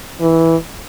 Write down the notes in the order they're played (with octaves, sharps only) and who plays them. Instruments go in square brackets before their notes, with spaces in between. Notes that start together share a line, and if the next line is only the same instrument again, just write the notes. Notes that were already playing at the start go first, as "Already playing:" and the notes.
[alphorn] E3